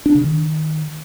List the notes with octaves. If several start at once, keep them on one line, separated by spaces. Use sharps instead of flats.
D4
C#3
D#3